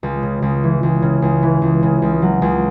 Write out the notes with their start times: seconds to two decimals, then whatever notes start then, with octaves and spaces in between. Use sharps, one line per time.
0.03 C#2
0.23 C#3
0.42 C#2
0.63 E3
0.83 C#2
1.02 C#3
1.22 C#2
1.43 E3
1.62 C#2
1.83 C#3
2.02 C#2
2.22 F#3
2.42 C#2